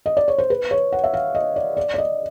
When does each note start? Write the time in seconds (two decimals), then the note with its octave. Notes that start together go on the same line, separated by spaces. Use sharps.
0.06 D#5
0.17 D5
0.28 C#5
0.38 C5
0.50 B4
0.71 C#5
0.93 F#5
1.04 E5
1.13 F5
1.35 D#5
1.56 D5
1.77 D5
1.94 D5
1.98 D#5